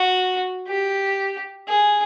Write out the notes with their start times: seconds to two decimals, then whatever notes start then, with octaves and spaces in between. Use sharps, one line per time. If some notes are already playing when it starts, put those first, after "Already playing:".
Already playing: F#4
0.68 G4
1.68 G#4